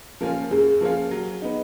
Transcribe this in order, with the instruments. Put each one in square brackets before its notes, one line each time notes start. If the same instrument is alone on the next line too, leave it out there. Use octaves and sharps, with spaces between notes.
[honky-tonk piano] F3 A#3 C#4 F4
[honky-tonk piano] F#2 [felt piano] G#4
[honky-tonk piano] F3 A#3 C#4 F4
F#3
B3 D#4